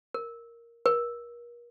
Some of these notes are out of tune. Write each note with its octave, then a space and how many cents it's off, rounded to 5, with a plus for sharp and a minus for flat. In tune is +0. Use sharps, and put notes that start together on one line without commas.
A#4 +0
A#4 +40